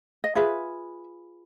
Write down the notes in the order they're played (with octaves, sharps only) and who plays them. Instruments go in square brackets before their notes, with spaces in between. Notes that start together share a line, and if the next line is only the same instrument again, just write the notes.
[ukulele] D#5
F4 G#4 B4 E5